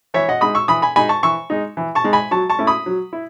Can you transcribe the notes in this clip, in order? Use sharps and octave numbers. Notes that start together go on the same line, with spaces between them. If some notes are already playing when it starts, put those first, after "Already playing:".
E3 C#5 E5
D#5 F#5
G#3 D#4 B5 D#6
C#6 E6
E3 B5 D#6
G#5 B5
G#3 D#4 G#5 B5
A5 C#6
E3 C#6 E6
G#3 D#4
E3
A5 C#6
G#3 D#4
G#5 B5
F#3 A5 C#6
A5 C#6
A3 C#4 E4
B5 D#6
F#3
E4